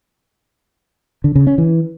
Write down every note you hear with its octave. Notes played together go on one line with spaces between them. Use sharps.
D3
C#3
C#4
E3